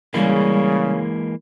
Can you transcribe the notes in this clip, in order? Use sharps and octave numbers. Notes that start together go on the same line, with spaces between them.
C#3 E3 G3 G#3 A#3